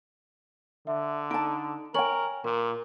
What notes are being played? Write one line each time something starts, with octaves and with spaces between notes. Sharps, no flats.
D3 E5
D#4 A5 D7
A#4 C#5 G5 G#5 C#6 F#7
A#2 A#4